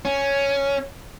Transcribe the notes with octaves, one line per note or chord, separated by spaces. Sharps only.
C#4